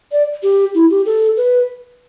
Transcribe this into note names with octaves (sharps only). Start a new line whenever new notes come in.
D5
G4
E4
G4
A4
B4